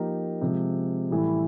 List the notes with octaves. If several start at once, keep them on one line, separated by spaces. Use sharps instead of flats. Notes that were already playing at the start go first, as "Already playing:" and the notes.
Already playing: F3 A#3 D#4 G4 A#4
C3 F3 G#3
A2 E3 G3